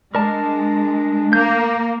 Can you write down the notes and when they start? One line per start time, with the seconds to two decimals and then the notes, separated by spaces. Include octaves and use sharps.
0.15 G#3 D4 A#4 A5
1.33 A#3 G6